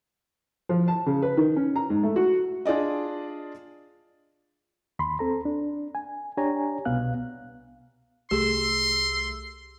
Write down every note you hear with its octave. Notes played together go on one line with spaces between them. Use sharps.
F3
A5
C#3
B4
D#3
C#4
A#5
G#2
A3
F#4
D4 F4 G#4 D5 D#5
D#2 B5 C6
C4 A4 A#5
D4
G#5
D4 G4 C#5 G#5 A#5
C2 B2 B3 F5 F#6
C2 A3 G4 G#4 C6 E6